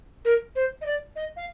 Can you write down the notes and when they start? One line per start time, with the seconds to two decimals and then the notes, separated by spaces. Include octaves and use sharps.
0.25 A#4
0.56 C5
0.81 D#5
0.86 D5
1.16 D#5
1.36 F5